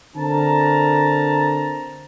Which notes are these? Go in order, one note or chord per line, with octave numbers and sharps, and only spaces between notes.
D3 C4 A#4 A5 A#5